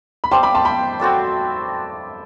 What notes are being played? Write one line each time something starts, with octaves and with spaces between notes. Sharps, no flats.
B5
G3 C4 G4 C5 A5 C6
B5 D6
A5 C6
G5 B5
C4 F#4 A4 D5